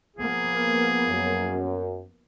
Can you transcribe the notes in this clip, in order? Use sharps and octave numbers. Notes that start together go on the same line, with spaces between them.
F3 A#3 B3 G#4
F#2